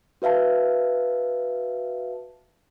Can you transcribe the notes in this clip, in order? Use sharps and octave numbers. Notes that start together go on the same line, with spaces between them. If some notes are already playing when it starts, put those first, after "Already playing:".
F#4 B4 E5 F5 A5